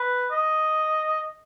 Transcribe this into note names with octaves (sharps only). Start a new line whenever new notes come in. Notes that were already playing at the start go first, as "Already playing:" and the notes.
Already playing: B4
D#5